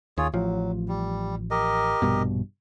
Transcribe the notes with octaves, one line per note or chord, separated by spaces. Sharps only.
D#2 F4 G#4 C#5
A1 F3 F#3
G3
G4 A#4 D#5
A#1 G2 B2